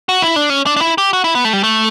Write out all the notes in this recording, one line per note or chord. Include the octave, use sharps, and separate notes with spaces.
F#4
E4
D4
C#4
D4
D4
E4
G4
F#4
E4
B3
A3
G3
A3